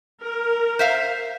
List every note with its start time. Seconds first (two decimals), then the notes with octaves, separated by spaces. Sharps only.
0.22 A#4
0.79 C5 E5 F5